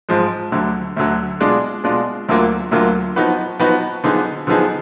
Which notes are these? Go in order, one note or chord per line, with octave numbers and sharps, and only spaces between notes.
G#2 F3 G#3
D2 D3 F#3
D2 D3 F#3
B2 G#3 D4 F4
B2 G#3 D4 F4
D2 D3 F#3 A#3 F4
D2 D3 F#3 A#3 F4
F3 B3 D#4 F#4 B4
F3 B3 D#4 F#4 B4
D3 F3 B3 D#4 G#4
D3 F3 B3 D#4 G#4